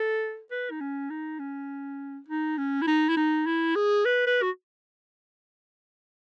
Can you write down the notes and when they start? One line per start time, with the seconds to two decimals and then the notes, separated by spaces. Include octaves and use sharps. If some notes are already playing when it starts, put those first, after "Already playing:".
Already playing: A4
0.51 B4
0.71 D#4
0.80 C#4
1.10 D#4
1.39 C#4
2.28 D#4
2.58 C#4
2.82 E4
2.87 D#4
3.09 E4
3.17 D#4
3.46 E4
3.76 G#4
4.05 B4
4.27 B4
4.42 F#4